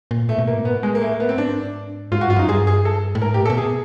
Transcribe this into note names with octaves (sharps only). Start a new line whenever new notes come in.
A#2
A2 A3
B2
A#2 A#3
G#2
A#2
A2 B3
G#3
A#3
A3
A#3
B3
C4
G2
G#2 D4
G#2 F4
F#4
G2
F4
F#2 D#4
G2 G#4
G#4
A4
A2
G#2 A#4
A2 G4
A#2
A4
B2
G#4